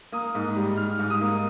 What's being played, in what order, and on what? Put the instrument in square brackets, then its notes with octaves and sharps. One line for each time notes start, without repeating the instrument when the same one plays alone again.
[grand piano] A#3 D#6
G#2
G3
G#2 F6
G#2
D#6
A#3